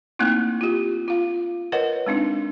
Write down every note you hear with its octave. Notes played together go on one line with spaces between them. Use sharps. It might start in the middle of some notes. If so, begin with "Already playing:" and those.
A3 A#3 C4 D#4 E4
F4 G4
F4 F5
A#4 B4 C#5 D#5 F#5
G#3 C4 D4 D#4